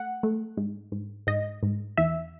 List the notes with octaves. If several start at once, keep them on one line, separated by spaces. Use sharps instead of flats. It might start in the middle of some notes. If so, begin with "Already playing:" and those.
Already playing: A3 F#5
A3
G#2
G#2
G#2 D#5
G#2
E2 E5